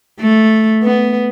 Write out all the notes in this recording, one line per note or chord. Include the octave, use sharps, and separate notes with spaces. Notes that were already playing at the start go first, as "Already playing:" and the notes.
A3
B3